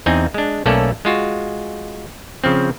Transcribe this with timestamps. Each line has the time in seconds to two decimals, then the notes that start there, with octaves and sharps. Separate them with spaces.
0.06 E2 C4 D#4 G#5
0.34 G#3 D4
0.66 B1 A3 A#3 C#4 A4 D5
1.05 G#3 F4 F#4
2.44 C#3 F3 C4